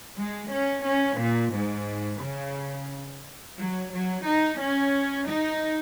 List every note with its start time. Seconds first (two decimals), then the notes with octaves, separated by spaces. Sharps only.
0.17 G#3
0.51 C#4
0.85 C#4
1.20 A#2
1.53 G#2
2.22 C#3
3.58 F#3
3.92 F#3
4.26 D#4
4.60 C#4
5.28 D#4